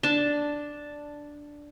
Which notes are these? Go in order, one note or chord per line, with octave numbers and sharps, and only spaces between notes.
D4 A5